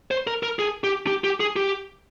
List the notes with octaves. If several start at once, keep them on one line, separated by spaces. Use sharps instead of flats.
C5
A#4
A#4
G#4
G4
G4
G4
G#4
G4